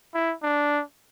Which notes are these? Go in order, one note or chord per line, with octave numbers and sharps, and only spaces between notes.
E4
D4